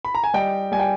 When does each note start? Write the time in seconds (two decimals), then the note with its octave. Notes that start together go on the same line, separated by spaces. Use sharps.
0.05 B5
0.15 A#5
0.24 G#5
0.34 G3 D#5 G5
0.72 G3 G#5
0.79 G5